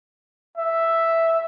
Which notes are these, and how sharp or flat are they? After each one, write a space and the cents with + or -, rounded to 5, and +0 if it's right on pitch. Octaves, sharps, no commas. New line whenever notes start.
E5 +0